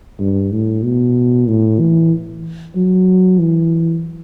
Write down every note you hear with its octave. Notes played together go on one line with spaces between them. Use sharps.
G2
A2
B2
A2
E3
F#3
E3